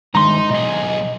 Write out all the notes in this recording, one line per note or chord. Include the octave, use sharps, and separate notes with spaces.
D3 D#3 G#3 D#4 A#5 C6
B1 G#4 D#5